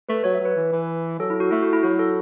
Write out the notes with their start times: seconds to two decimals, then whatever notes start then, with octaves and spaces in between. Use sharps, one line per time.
0.09 A3 B4
0.24 F#3 C#5
0.35 E5
0.40 F#3
0.45 B4
0.56 E3
0.72 E3
1.19 F#3 A4
1.30 E4
1.40 F#4
1.51 A3 E4
1.62 F#4
1.73 E4
1.83 F#3 F#4
1.99 A4